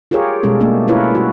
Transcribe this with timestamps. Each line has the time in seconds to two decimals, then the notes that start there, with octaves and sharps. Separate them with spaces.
0.11 F4 G4 G#4 A#4 C#5
0.43 B2 G3 G#3 C#4 A4
0.60 A3 A#3 D4 G4
0.88 C#4 E4 F4 A#4 B4 C#5
1.15 G3 F#4